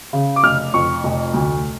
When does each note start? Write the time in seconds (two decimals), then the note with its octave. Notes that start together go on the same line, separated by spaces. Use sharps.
0.13 C#3
0.36 D6
0.43 F1 F6
0.74 F2 C#6
1.04 F1
1.34 D2